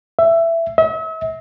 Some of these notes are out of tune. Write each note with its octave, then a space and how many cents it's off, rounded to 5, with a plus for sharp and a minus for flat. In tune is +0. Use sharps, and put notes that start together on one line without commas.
E5 +15
E5 -40